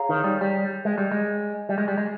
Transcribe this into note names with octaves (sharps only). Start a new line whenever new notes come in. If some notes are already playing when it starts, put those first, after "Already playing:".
Already playing: G#4 C#5 F5 A#5
D#3
G3
G3
G#3
G3
G#3
G3
G#3
G3
G#3